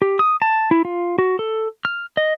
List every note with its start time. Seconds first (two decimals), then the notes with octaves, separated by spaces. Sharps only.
0.02 G4
0.19 D#6
0.42 A5
0.71 E4
0.85 F4
1.19 F#4
1.39 A4
1.85 F6
2.17 D#5